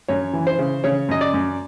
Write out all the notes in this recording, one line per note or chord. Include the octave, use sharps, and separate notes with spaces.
F#2 C#5
E3
C5
C#3
C#3 C#5
F#2 D#5
D5
F#2